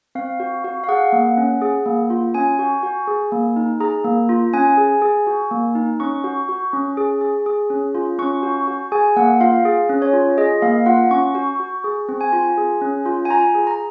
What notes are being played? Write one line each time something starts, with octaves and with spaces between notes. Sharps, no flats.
C4 F5
F#4
F#4
F5
G#4 F#5
A#3
C#4
G#4
A#3
F4
C#4 G#5
F#4
F#4
G#4
A#3
D#4
G#4 A#5
A#3
F4
C#4 G#5
G#4
G#4
F#4
A#3
D#4
C#4 C#6
F#4
F#4
C#4
G#4
G#4
G#4
C#4
F4
C#4 C#6
F#4
F#4
G#4 G#5
A#3 F#5
F4 F5
G#4
C#4
C#5
F4
G#4 D#5
A#3 F5
F4 F#5
C#4 C#6
F#4
F#4
G#4
C4
G#5
F4
G#4
C#4
F4
G#5
F4 A#5
G#4
A#5